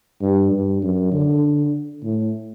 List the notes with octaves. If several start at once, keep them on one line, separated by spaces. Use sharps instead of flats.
G2
G2
F#2
D3
A2